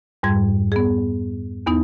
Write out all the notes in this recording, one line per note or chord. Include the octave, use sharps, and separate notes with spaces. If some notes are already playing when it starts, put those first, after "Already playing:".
F2 G#2 G3 G#6
B3 G#4
E2 B3 D#4